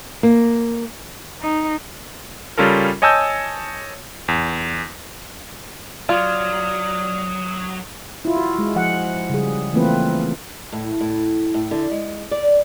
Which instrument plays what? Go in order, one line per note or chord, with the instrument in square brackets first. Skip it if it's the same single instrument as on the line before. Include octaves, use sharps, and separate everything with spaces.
[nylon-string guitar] A#3
[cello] D#4
[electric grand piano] C#3 G3 C#4 F4 A4 A#4
C#5 D#5 G#5 A5 E6 G6
E2
[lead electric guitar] F#3 [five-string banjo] F4 [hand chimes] D5 F6 G#6 [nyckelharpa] D#6
[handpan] E4 F4
F#4
G#3
F3 F#5
C#3 G3 G#4
E3 A3 A#3 C4 F4 B4
[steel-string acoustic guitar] A2
A2
A2
D3
G#3
D5